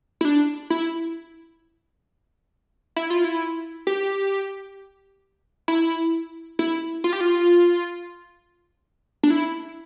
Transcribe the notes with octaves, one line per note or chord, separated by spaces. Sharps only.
E4
D4
E4
E4
F4
E4
G4
E4
E4
F4
G4
F4
D4
E4